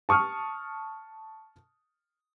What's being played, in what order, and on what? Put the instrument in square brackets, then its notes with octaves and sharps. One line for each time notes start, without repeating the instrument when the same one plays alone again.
[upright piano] A5 C#6 D#6 F6